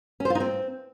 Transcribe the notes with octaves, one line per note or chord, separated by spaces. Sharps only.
C#4
C5
F4
D#4
C4